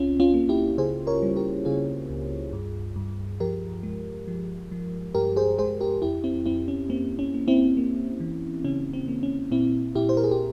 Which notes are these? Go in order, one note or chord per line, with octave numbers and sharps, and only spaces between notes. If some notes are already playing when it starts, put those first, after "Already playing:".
Already playing: C#2 C4 C#4 F4
C#4 F4
A#3
E4 G4
C#3 G#4 C5
A#4 C#5
G3
G4 A#4
C#3 F4 G#4
C#2
G2
G2
F3 G4 A#4
G#3
F3
F3
G2 G4 A#4
G#4 C5
G#3 G#4 C5
G4 A#4
F2 E4 G4
C4 E4
F2 C4 E4
C#4
A#3 C4
C#4
A#3
C4 E4
A#3
E3
C#3 C#4
C4
A#3
C#4
A#2 C4 E4
A#2 E4 G4
C5
A#4
G#4
G4